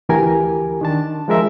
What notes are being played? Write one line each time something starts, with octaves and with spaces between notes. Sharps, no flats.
D2 E3 G4 A#4 G#5
D#3 D4 A5
F3 G#3 A#4 E5